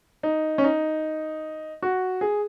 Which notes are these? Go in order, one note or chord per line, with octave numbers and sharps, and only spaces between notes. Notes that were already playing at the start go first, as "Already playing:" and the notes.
D#4
C#4
D#4
F#4
G#4